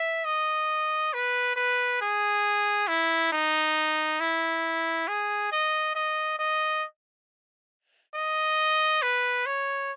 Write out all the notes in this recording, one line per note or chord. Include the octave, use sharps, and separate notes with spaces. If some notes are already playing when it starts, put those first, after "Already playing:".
Already playing: E5
D#5
B4
B4
G#4
E4
D#4
E4
G#4
D#5
D#5
D#5
D#5
B4
C#5